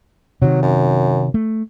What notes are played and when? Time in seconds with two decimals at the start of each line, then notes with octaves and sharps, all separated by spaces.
0.42 C3 D#3 F#3
0.63 F#2
1.34 A3